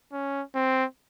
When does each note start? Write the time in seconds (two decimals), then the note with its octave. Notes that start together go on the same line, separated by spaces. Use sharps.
0.13 C#4
0.55 C4